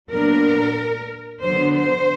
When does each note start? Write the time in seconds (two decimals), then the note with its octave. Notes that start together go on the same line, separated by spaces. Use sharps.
0.11 A#2 F#3 B3 D4 A#4
1.42 D3 F#3 B3 C5
1.75 C5